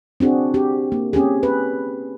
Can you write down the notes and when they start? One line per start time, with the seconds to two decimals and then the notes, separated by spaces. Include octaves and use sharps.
0.20 C4 D4 F#4 G#4
0.54 G4
0.92 A#3
1.13 C4 C#4 G4 G#4
1.43 B4